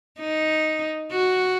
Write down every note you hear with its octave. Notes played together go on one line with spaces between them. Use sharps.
D#4
F#4